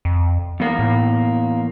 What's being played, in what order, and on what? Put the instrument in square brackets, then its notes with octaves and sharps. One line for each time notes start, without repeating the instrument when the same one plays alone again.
[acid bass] F2
[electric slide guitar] E2 A#3 [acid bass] B3
[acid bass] A2